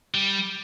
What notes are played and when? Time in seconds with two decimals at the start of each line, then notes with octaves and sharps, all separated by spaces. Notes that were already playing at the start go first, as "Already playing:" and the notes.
0.14 G3